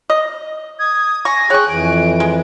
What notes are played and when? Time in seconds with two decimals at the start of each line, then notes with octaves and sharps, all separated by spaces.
0.10 D#5
0.79 D#6 G#6
1.25 G#5 C#6 A#6
1.50 G#4 C#5 G5 C#6 F#6
1.69 F2 E3 D7
2.20 G#3